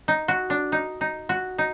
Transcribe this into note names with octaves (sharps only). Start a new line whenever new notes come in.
D#4
F#4
D4
D#4
D#4
F#4
D#4